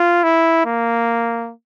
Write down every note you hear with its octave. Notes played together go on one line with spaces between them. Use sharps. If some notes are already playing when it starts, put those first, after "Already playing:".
Already playing: F4
E4
A#3